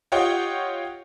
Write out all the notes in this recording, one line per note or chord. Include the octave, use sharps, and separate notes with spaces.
F4 G4 C#5 D#5 F#5 G5